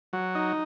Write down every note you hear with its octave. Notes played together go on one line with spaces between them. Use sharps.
F#3
D#4